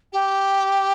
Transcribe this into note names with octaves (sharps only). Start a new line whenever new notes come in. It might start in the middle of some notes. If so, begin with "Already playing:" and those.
G4